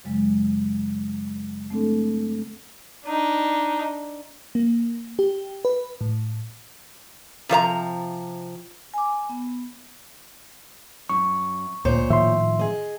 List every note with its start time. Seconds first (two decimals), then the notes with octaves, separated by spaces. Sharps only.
0.04 F#2 C#3 F#3 G#3
1.70 A3 C4 D4 A4
3.05 D4 D#4
4.55 A#3
5.19 G4
5.65 B4
6.01 A2
7.49 C3 F3 C5 A#5
8.94 G#5 D6
9.29 B3
11.09 F#2 C#6
11.85 D2 A#2 C5 C#5
12.10 A2 D#3 F3 E5 C6
12.59 G#4 D#5